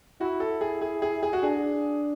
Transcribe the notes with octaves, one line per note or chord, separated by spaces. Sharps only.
E4 F#4
A4
G#4
G#4
G#4
G#4
F#4
D4 G#4